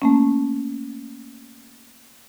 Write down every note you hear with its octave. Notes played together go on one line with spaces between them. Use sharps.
A3 A#3 C#4